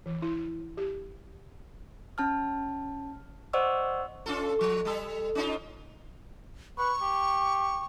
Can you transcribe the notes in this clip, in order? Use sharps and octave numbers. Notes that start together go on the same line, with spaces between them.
E3
E4
G4
C#4 A5 F6
C5 D5 D#5 F#5 C#6 E6
C#4 F4 A4
F3
G3 A4
C#4 D#4 F4
B4 C#6
G4